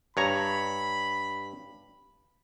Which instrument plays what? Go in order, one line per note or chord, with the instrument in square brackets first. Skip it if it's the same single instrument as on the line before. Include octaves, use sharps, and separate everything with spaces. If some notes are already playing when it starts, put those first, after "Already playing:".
[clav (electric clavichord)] G2 C#5 A#5 [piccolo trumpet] B5